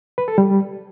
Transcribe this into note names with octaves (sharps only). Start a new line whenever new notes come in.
B4
A4
G3